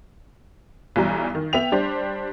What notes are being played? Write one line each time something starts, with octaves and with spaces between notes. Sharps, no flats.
B1 E3 G3 A#5
D#3
B3 E5 G5 F7
G3 D4 G4 C5